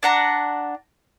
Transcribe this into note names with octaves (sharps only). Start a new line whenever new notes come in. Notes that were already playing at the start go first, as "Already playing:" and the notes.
D4 F#5 A#5